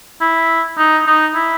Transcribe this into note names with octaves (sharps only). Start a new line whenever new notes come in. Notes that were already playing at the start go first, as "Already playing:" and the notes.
E4
D#4
D#4
E4